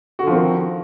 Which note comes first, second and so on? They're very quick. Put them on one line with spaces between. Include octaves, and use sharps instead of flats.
F#4 D3 F3 C4 D#3